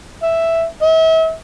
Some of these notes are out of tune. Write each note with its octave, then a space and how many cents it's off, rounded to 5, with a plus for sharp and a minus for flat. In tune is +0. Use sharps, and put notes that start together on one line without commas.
E5 +0
E5 -40